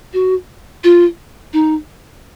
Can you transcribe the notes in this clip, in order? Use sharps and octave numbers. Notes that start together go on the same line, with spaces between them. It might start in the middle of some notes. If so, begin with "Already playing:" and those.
F#4
F4
D#4